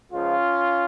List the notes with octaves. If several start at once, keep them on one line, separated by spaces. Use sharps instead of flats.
C#2 C#3 F3 C#4 F4